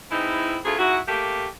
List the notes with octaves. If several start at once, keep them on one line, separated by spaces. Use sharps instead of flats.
E3 G#3 C4 D#4 E4
D2 A3 F4 G#4
G#2 E4 F#4
A3 A#3 G4